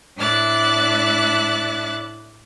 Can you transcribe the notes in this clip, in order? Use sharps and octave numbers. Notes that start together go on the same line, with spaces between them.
A2 D4 E4 D5 F#6 A6